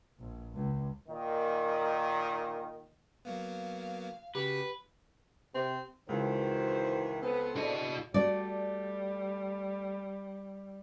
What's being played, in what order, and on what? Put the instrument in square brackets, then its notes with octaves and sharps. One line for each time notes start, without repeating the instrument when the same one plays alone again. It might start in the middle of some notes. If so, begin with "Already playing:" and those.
[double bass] A#1
C#2
[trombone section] A#2 D#3
[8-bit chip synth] F#3 A#3 B3 [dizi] F5
[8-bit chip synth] C#3 F#4 [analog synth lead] G4 [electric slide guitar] B4
[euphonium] C3 [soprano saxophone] C4
[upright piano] C#2 [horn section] D#3 E3 [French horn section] F#4 C5
[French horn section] B3 [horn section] C4 A4
[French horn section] E2 D3 [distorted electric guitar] F#4 D#5
[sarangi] G3 [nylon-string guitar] A3 F#4 D5